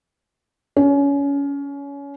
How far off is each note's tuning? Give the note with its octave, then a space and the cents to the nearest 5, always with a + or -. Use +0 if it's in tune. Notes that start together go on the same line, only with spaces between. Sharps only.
C#4 +25